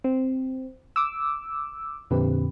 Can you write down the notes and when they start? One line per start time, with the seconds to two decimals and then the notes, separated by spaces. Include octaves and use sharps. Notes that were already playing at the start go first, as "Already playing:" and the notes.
0.04 C4
0.96 D6 E6
2.10 F2 A#2 D3 C4 G4 B4